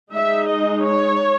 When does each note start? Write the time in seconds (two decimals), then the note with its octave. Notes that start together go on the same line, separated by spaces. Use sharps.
0.13 G#3 D#4 E5
0.49 D#5
0.85 C#5